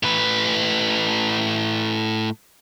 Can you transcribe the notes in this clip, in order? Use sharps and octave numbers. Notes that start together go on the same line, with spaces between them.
A2 B4